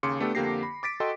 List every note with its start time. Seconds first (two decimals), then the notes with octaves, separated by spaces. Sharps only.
0.03 D#2 C#3 C6 D6 C#7
0.20 A3 B3 D4 G4 A4
0.35 F2 D3 A#3 G4 A#6 C7
0.63 B5
0.83 D6 A6 B6 D7
1.00 F#4 A4 D#5 G5 C6